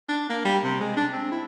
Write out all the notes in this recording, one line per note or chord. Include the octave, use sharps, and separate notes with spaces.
D4
A#3
G3
C3
G#3
D4
C4
E4